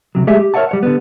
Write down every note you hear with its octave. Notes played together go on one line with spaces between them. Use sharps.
D2 C3 F#3
G#3 A3 G4 G#4 E5
G4
A#4 C#5 D5 E5 F#5 A5
G3 C#5 F#5
D3 G3 B3